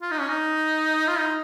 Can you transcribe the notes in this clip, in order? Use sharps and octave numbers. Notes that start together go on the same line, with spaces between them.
F4
D#4
C#4
D#4
F4
D#4